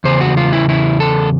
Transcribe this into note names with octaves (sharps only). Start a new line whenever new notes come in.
E2 C#3 C5
F#4
F4
E4
E4
A4